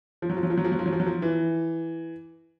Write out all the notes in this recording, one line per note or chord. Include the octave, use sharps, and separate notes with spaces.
F3
F#3
F3
F#3
F3
F#3
F3
F#3
F3
F#3
F3
F#3
F3
E3